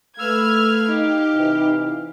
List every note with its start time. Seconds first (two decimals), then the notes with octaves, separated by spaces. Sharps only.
0.19 A3 B4 F5 E6 F6 G#6
0.88 D#4 G4
1.34 C3 E3